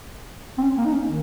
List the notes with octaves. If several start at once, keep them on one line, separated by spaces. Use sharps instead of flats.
C4
C#4
A#3
D#4
C#4
D#3